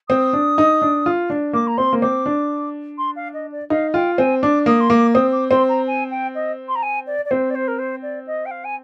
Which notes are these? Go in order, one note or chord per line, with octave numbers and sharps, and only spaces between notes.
C4 D#6
D4
D#4
D4
F4
D4
A#3 D6
A#5
C4 C6
A#3
C4 D6
D4
C6
F5
D#5
D5
D#4 F5
F4 G5
C4 G#5
D4 D6
A#3 D#6
C6
A#3 D6
C4 D#6
D6
C4 C6
A#5
G#5
G5
D#5
C6
A#5
G#5
D5
D5
C4 C5
D5
C5
A#4
C5
D5
D#5
G5
F5
G#5